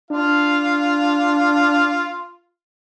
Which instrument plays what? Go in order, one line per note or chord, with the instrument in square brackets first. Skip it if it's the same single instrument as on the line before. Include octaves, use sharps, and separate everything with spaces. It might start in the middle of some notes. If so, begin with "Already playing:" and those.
[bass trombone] D4 [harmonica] F4 F5